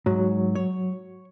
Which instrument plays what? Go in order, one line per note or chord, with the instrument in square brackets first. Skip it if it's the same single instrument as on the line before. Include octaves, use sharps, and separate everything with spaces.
[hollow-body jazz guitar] G#2 [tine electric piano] F#3
[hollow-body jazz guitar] C#5